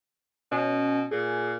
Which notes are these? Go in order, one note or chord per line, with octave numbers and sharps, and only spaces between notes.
B2 C#4
A#2 G#4